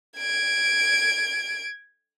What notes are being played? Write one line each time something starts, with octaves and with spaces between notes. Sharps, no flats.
G#6 D7